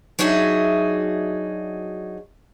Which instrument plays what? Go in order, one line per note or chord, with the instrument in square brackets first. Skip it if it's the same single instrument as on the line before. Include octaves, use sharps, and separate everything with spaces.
[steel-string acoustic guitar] F#3 D4 D#4 F#4 G#4 E5